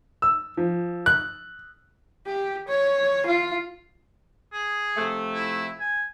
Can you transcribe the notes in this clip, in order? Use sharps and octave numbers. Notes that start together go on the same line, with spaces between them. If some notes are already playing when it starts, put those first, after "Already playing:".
E6
F3
F#6
G4
C#5
F4
G#4
C3 F3 A3
E4
G#5